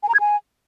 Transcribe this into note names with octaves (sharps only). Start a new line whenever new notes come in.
G#5
A#5
G#6
G#5